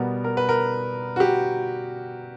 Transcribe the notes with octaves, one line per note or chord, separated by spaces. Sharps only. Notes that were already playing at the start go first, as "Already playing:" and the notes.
Already playing: B2 G3 B3 A#4
A#4
B4
A#4
F#4
G4